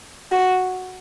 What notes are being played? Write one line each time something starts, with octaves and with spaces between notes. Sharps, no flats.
F#4